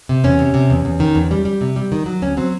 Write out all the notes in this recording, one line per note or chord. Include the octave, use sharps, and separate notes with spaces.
C3
E2 C#4
C3
C3
E2
E2
D#3
E2
G3
G3
C3
G3
D#3
F#3
D2 C#4
F#3 C4